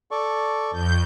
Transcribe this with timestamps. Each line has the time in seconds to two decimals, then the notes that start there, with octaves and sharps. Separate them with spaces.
0.11 A4 D5 C#6
0.71 F2 G6